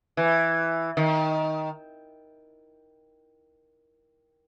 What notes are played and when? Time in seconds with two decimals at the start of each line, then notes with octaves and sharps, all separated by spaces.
0.17 E3
0.97 D#3